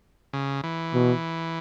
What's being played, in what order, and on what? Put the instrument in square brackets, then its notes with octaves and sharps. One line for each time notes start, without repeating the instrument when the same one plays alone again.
[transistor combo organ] C#3
E3
[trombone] B2